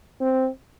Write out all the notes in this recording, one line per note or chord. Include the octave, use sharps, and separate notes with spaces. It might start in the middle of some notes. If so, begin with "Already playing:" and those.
C4